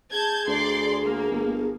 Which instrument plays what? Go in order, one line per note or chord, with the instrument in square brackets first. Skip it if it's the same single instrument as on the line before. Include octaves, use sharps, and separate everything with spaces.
[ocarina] G#4 [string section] A5 G6 G#6
[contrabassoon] D2 [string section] D5 C6
[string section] A#3
[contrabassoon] G1